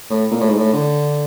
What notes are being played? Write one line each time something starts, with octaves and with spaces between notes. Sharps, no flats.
A2
A#2
A2
G#2
A2
D3